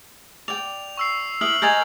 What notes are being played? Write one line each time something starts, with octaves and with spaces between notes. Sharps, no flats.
D5 G5 F7
C#6 E6 C7
E4 B4 D#6 F6 F#7
A#4 D#5 G#5 G6 A6 F7